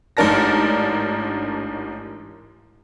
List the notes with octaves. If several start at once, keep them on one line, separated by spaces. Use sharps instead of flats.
A1 G#2 D4 A#4 A5 A#6